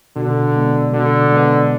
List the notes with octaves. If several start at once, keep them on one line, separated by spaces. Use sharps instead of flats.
B2 D3
G#3 B3
B2 D3
G#3 B3